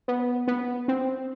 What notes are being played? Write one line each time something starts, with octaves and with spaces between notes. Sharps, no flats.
B3
B3
C4